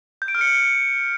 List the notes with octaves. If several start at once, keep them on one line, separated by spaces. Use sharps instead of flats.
G6
D7
F6
C#7